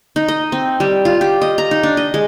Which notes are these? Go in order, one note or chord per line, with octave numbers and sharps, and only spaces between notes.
D#4
D#5
C4
G3
F4
G4
D#5
A#5
D#4
D4
D#5
G#3